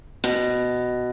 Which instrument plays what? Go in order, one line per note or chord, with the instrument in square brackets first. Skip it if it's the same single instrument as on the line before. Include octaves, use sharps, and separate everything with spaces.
[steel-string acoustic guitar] B2